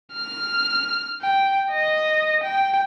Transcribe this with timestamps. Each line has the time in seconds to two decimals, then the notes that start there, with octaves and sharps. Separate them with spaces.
0.14 F6
1.22 G5
1.72 D#5
2.43 G5